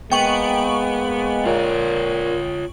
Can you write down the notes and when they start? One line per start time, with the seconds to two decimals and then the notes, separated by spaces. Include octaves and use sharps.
0.12 G#3 A#3 B3 G5 C#6 F#7
1.46 A#2 F4 C#5